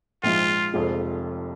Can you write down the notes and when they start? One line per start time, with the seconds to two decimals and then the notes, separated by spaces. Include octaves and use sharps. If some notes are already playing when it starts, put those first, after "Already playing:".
0.23 A#1 G#2 F3 F4
0.74 F1 F2 F3 G#3